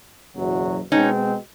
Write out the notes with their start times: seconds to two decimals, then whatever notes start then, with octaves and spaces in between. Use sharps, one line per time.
0.35 F#1 E2 B2 F#3
0.91 B2 G#3 C4 C#4 D#4